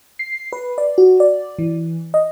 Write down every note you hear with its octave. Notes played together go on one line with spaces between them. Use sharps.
C7
B4
D5
F#4
D5
E3
D#5